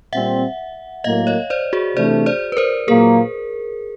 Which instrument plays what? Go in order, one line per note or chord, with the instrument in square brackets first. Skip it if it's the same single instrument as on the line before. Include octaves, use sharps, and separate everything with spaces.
[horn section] A#2 G3 C4 [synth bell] E5 F#5
[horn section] A2 F#3 A#3 [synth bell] D#5 F5
[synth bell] C#5 D#5
C5 D5
F#4 G#4
[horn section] C3 E3 A3 D4 [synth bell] C5 D5
[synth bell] C5 D5
B4
A#4 C5
[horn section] A#2 F#3 A#3 [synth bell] G#4 A#4